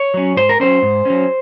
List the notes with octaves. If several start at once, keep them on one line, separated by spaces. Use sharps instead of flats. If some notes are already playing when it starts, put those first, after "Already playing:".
Already playing: C#5
F#3 C#4
G#2 C5
A#4
F#3 C#4 C5
G#2
F#3 C#4